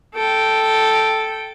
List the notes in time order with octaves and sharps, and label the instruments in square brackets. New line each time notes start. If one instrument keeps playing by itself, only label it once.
[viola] A4 G5